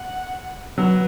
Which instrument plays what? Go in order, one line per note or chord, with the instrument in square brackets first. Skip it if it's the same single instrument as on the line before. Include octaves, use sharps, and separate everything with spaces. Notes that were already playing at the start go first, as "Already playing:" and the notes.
Already playing: [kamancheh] F#5
[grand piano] F#3 [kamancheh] B4